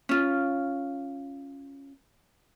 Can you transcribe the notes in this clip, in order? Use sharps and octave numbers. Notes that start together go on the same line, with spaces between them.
C#4 F4